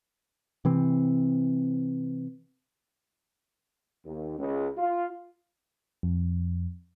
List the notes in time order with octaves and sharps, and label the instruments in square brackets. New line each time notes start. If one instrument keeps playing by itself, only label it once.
[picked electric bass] C3 E3 C4
[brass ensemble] D#2
C#2
F4
[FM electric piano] F2